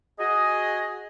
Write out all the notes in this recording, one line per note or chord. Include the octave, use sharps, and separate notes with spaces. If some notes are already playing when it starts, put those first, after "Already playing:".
F#4 G#4 D#5